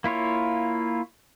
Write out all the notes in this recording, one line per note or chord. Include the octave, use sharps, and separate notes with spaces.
A#3 E4 F4 C#5